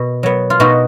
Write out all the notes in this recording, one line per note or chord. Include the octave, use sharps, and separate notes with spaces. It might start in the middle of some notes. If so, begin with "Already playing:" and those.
Already playing: B2
F#3 B3
F4
B2 D#4 F#4